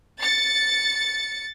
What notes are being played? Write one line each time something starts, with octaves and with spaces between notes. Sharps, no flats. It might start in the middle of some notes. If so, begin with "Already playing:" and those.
A6 C#7